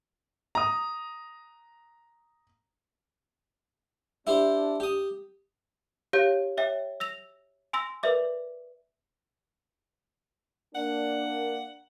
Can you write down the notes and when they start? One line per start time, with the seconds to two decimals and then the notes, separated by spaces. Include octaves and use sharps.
0.55 A#5 D#6
4.27 D4 E4 G4 C5
4.80 G4 D#6
6.13 G4 C#5 F5 G6
6.57 C#5 E5 G5
7.00 E6 A#6 F7
7.73 G#5 C6 E6 A#6
8.03 A#4 B4 D5 E5 D6
10.75 A#3 D4 F#5